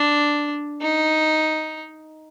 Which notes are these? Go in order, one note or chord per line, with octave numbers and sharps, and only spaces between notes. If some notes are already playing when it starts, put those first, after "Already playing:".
Already playing: D4
D#4